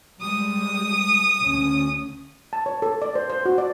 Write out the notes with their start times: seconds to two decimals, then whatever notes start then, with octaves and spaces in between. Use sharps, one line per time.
0.21 G3 G#3 D#6
1.41 D2 D3 C#4
2.53 A5
2.66 C#5
2.82 A4
3.02 D5
3.15 C5
3.30 C5
3.45 F#4
3.58 D5